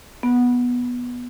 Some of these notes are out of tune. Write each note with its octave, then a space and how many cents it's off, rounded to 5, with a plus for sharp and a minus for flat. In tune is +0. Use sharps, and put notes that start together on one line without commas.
B3 -10